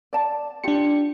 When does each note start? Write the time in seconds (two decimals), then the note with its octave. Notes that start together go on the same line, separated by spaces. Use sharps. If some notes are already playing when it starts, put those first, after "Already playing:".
0.13 D5 A5
0.64 D4 F4 G4 C#7